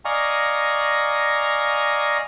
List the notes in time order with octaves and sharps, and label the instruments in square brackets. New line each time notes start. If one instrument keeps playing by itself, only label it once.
[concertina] D5 D#5 F5 G#5 A#5 C#6